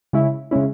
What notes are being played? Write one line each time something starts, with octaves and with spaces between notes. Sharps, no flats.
C#3 G#3 C#4 E4
C#3 G#3 C#4 E4